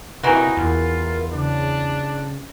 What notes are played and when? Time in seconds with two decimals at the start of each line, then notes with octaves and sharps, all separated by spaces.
0.23 C3 E3 A#3 D#4 F#4
0.57 E2 F4 A#4
1.33 C#3 D4